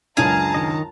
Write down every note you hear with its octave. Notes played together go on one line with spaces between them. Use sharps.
C#2 F#2 D4 G#4 F5 A5 A#5
D#3 D#5